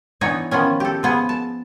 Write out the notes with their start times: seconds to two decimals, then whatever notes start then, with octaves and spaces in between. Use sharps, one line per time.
0.21 E3 B3 D4 D#4 C#5
0.51 D#3 F3 B3 C#4
0.80 G4 A4
1.03 F3 B3 G#4
1.29 A5